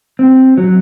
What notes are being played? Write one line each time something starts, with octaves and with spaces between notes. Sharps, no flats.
C4
F#3